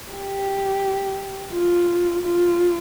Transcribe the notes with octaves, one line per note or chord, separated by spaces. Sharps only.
G4
F4
F4